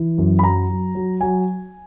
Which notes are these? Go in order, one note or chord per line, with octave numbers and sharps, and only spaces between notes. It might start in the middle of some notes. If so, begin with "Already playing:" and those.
Already playing: E3
F#2
B5
F#3 A#5
F#3
F#3
F#3 G#5